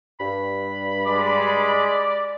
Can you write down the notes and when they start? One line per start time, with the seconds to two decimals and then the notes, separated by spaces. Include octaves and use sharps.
0.20 G2 B5
1.06 G#3 D5